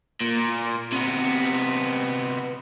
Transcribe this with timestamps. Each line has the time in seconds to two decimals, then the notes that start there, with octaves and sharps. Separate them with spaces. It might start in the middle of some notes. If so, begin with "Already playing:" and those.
0.21 A#2
0.92 C3 B3